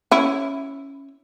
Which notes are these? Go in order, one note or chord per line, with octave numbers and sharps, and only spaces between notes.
C#4 E4